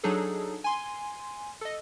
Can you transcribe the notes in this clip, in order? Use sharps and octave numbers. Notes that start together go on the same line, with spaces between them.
F#3 D4 D#4 G#4 A4
G#5 C6
A4 D#5